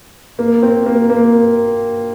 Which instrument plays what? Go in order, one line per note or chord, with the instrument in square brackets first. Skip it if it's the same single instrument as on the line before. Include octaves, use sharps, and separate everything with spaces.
[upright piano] A#3
C4
A#3
A#3